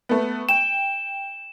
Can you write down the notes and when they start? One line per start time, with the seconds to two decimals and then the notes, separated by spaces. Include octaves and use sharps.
0.09 A3 B3
0.49 G5 E7